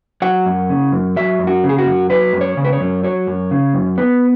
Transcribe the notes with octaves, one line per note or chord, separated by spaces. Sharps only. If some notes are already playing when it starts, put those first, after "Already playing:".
F#3 F#5
F#2
C#3
F#2
F#3 E5
F#2
F#4
C#3
G#4
F#4
F#2
F#3 B4
F#2
C#5
C#3
B4
C#5
F#2
F#3 C#5
F#2
C#3
F#2
B3 B4